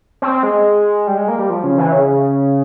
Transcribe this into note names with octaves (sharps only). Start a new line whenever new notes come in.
C4
G#3
G3
G#3
A#3
G3
F3
C#3
E3
C#3